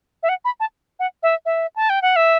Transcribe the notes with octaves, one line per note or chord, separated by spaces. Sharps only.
E5
F#5
B5
A5
F#5
E5
E5
A5
G5
F#5
E5